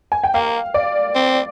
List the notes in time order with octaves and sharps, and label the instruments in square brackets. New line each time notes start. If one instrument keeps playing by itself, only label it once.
[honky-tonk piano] G#5
G5
[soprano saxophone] A#3 [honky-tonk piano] F5
[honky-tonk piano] D5
[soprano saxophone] C4